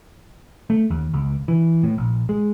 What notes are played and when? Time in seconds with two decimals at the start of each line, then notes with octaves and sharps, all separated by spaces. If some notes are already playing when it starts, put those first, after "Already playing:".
0.70 A3
0.90 D#2
1.14 C#2
1.48 E3
1.83 A2
1.98 A#1
2.29 G#3